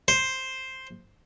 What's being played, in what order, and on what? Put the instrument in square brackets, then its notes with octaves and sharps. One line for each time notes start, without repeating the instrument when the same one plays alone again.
[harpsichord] C5